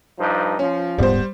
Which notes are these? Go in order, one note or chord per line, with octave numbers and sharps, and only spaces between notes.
G2 F3 D#4
F3 C#4
D#1 G#2 G3 B3 C5